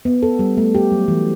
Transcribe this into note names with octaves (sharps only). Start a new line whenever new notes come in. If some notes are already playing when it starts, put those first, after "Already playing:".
B3
A4
G3
A3
G4
F#3
E3